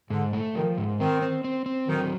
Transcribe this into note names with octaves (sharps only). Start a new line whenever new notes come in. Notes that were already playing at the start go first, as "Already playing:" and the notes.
G#2 D3
A3
D#3 F3
G#2
D#3 C4
C4
C4
C4
D#3 F#3